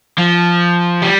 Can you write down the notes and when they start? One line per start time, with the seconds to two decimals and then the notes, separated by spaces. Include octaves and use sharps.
0.18 F3
1.03 G3